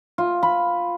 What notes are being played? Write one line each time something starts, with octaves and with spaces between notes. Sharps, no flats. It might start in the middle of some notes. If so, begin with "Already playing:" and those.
F4
B5